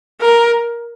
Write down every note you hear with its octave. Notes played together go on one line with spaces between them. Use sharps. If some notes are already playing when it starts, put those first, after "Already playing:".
A#4